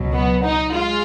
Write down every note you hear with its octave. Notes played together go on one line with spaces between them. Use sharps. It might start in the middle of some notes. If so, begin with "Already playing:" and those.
Already playing: C#2 B2 F#3
B3
D#4
G#3 F4